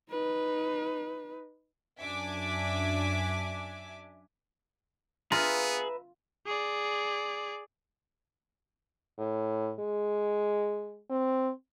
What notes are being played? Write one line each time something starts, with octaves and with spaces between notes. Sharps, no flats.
D#4 B4
F#2 D4 E5 G#5 D6
B3 F4 G#4 B4 E5 A#5
G#4 D5
A2
G#3
C4